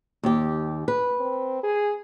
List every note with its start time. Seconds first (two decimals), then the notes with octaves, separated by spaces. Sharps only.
0.23 D#2 G4
0.88 B4
1.20 C4
1.63 G#4